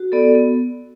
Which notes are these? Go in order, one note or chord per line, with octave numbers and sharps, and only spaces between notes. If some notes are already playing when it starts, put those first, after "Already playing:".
Already playing: F#4
B3 A4 D5
B3